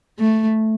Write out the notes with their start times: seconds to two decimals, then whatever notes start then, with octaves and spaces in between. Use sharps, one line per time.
0.19 A3